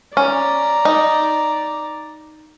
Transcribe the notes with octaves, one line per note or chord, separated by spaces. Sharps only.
C#4 D5 A#5
D#4